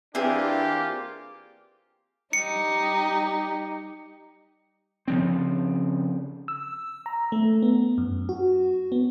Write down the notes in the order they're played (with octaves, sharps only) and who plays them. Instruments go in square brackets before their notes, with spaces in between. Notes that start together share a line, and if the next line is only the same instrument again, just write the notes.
[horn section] E3 D4 [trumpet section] A#3 F4 G4 [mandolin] C4 G#4
[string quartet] G3 D#4 G4 [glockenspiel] C#7
[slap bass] C#3 F3 C4
[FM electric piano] E6
A#5
A3
B3
F#2
F#4
B3